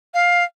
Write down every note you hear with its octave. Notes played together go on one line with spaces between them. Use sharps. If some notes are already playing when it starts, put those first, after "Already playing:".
F5